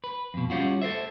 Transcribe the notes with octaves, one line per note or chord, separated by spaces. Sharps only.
B4
F2 B2
G3 C#4 F4 F#4
A4 A#4 C5 E5